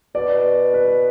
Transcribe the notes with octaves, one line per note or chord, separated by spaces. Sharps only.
B2 D5
B4